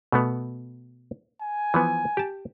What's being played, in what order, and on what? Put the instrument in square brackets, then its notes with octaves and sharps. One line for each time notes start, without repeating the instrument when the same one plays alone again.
[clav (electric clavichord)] B2 A3 B3
[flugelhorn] G#5
[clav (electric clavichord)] E3 F3 B3
G4 A5